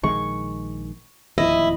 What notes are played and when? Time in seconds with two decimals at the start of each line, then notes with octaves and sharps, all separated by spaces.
0.04 A#1 D#3 G#3 C#6
1.38 D1 D#2 F3 E4 D#5